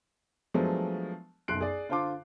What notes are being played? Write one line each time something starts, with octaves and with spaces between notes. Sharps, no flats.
F3 F#3 G#3 A3 B3 D4
F#1 B1 C6 F#6 C7 D7
G#4 D5
D3 F4 C5 A5 C6 D6